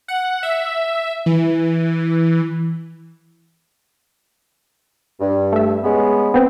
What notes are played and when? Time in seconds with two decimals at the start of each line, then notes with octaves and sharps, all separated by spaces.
0.08 F#5
0.43 E5
1.26 E3
5.20 G2
5.53 A3 E5
5.83 G#3 B3 C#4
6.34 B3 C4 B4